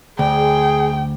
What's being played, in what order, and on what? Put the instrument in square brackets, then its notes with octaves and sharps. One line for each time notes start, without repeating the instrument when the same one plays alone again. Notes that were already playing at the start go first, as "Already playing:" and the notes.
[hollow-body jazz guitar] D2 [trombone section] G#4 [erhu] G5